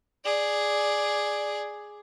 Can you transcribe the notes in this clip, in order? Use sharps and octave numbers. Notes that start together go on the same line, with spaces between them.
G#4 D5